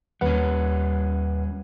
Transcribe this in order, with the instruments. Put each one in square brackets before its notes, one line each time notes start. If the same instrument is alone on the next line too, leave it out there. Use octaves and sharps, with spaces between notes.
[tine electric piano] D#2 B4 F#5 [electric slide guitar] G3 C#4